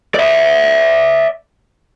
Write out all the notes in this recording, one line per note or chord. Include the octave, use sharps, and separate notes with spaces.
D5 E5